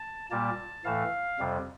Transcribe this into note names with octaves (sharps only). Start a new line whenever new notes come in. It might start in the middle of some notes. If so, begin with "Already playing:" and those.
Already playing: A5
A#2 G3 A#3 A5
A2 E3 A3 F5
F2 C3 G3